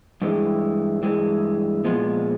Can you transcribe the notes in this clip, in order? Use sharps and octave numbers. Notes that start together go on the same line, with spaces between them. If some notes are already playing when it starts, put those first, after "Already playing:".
G2 E3 G#3
G2 E3 G#3
A#2 F3 G#3 B3